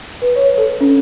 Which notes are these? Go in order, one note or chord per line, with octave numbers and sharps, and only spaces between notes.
B4
C#5
A4
C#4